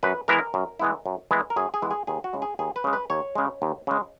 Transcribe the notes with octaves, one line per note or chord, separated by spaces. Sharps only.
F#2 B4
E3 G#3 B3 E4 A#4
F#2
E3 G#3 B3 E4
F#2
E3 G#3 B3 E4
A#4
F#2 G#4
G#4
E3 G#3 B3 E4
G#4
D#2 G#4
F#4
C#3 G#3
G#4
D#2 G#4
B4
C#3 G#3
B4
D#2 C#5
C#3 G#3
D#2
C#3 G#3